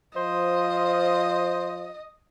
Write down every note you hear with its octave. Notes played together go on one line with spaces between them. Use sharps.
F3 C5 D#5